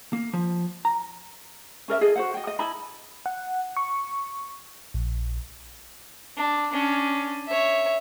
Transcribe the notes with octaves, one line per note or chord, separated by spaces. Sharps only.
A#3
F3
A#5
C#4 A#4 D#5 E5
E4 G#4 A4 D#5
F#4 C5 F#5
D#5 G5
D#5
E4 D#5 A5 B5
F#5
C#6
A#1
D4
C#4 D4
C#5 E5